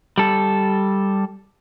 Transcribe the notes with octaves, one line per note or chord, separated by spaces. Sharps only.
G3 A4